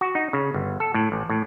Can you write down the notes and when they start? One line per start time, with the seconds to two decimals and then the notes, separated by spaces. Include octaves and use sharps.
0.01 F#4
0.15 D#4
0.33 C#3
0.54 G1
0.80 A4
0.94 A2
1.12 A1
1.30 A2